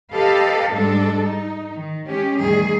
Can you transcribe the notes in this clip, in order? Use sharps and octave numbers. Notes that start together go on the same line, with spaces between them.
G4 A4 B4 D#5 F5
G#2 G3 G#3 D4 A4
D#4
D#3
G#3 C#4 G4
E2 A2 D#3 G3 G#4